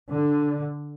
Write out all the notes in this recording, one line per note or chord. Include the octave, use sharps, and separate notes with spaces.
D3